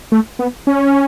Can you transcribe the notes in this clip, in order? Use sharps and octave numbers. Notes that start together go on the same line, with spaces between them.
A3
B3
C#4